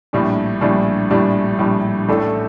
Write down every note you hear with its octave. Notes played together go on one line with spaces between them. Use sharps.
A#1 A2 G3 D4
A#1 A2 G3 D4
A#1 A2 G3 D4
A#1 A2 G3 D4
A1 A2 A3 D4 A4